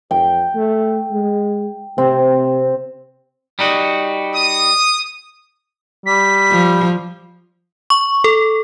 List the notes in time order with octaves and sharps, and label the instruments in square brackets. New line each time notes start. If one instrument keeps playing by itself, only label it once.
[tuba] F2 [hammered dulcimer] G5
[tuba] A3
G#3
[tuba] C3 [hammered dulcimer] C4
[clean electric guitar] G3 D#4 F#4
[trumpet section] D#6
[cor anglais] G3 [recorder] B6
[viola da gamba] F3
[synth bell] C#6
A4